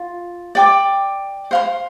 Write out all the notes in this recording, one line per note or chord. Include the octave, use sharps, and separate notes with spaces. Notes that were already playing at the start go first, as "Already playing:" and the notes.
Already playing: F4
D5 G5 D6
C5 F5 C6